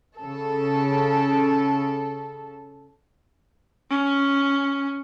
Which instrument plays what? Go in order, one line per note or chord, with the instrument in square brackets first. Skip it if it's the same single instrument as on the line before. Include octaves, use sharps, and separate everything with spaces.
[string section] C#3 A4
[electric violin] C#4